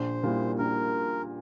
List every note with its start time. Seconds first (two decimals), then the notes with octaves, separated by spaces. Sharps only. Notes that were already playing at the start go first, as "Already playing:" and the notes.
Already playing: A#1 C5
0.23 A#2 G3 A#3 E4
0.58 A#1 A#4